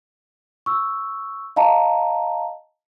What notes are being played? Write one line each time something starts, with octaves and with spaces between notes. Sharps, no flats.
C#6 E6
D#5 F5 A5 A#5